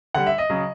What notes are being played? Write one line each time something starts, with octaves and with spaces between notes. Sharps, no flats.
D3 G3 F#5
E5
D#5
C#3 F#3